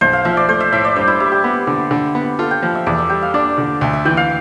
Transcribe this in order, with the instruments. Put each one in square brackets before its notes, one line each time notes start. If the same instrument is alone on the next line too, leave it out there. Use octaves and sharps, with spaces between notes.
[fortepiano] B1 [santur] C5
[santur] F5
[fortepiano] F3 [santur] E5
[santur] D5
[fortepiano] A3 [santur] C5
[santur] E5
[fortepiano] A2 [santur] E5
[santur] D5
[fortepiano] G2 [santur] C5
[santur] E4
[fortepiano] G3 [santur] E4
[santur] G4
[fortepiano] B3
D3
D3
B3
[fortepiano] F4 [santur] A4
[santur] G5
[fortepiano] F3 [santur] F5
[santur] E5
[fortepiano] E2 [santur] D5
[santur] E5
[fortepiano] G3 [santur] G5
[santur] F5
[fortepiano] D4 [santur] D5
[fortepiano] D3
[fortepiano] D2 [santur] E5
[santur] E5
[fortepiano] E3 [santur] G5
[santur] F5